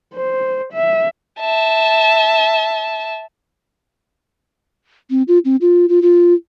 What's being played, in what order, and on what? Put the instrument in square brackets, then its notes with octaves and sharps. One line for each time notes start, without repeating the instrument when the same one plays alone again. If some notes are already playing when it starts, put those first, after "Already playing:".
[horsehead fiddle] C5
E5
[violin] E5 A5
[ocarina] C4
F4
C4
F4
F4
F4